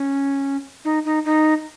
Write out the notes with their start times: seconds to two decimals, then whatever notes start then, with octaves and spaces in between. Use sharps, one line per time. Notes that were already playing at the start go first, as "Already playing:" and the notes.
Already playing: C#4
0.85 D#4
1.05 D#4
1.25 D#4